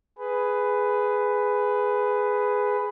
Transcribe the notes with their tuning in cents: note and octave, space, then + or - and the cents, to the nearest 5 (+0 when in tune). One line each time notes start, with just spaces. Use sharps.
G#4 +0 B4 +10